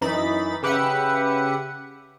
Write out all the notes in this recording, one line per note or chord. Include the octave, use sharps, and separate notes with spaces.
F#2 E3 D#4 B5 A6
C#3 G4 B4 E5 F#5 C#7